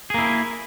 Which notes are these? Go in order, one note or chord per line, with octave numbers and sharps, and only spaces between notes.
A#3 E4 G#4